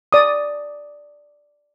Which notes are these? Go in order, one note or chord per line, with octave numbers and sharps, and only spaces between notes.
D5 D#6